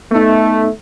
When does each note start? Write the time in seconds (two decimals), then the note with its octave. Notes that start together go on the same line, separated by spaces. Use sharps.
0.12 A3 B3 D#4